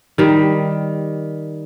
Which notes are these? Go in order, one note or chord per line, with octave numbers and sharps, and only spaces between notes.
D#3 G3